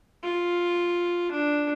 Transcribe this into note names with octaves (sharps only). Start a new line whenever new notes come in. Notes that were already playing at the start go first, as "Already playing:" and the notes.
F4
D4